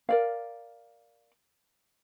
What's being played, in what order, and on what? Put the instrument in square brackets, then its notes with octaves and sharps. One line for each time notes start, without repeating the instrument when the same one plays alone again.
[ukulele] A#4 D5 F5